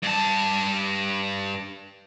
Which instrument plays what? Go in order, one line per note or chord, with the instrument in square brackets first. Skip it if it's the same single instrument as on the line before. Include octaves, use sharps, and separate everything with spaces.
[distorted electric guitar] G2 A5